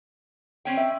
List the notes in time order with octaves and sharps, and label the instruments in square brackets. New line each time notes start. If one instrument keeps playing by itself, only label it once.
[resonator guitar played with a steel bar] C4 C#4 G5
[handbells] E5